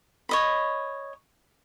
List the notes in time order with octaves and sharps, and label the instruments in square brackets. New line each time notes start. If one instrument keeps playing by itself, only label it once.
[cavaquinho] C#5 D#5 B5